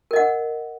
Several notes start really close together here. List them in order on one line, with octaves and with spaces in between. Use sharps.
A#4 D#5 F#5